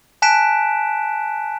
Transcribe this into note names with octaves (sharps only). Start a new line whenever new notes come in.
G#5 A5 F#6 B6 D7 E7